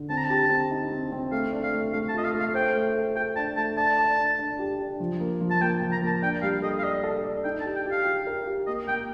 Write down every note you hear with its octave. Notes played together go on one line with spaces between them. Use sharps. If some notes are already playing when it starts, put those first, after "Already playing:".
Already playing: D3
C4 A5
A#5
A5
G4
C4
D#4
C4
C4
A3 F5
D4
F5
A3
A3 F5
A5
F4 D#5
F5
A3
F5
C5 G5
A3
A4
A4 G5
D4 A5
A3 A5
D5 A5
D5
D4
D4
G4
D4
F3
A#3
F3
A5
A#3 G5
F3
A#5
A#3 A5
D4 G5
G3 F5
A4 D#5
F5
D5 D#5
A4
D5
D#4 G5
A5
G4
G5
G4
F5
G4
A#4
G4
A#3 D#5
A#3 G5